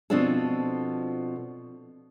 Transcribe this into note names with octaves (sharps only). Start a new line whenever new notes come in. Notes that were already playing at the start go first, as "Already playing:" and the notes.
B2 F3 C4 D4 F4 A4